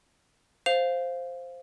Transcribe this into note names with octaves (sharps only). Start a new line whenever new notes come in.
C5 F5 F7